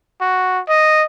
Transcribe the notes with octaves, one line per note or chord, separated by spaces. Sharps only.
F#4
D#5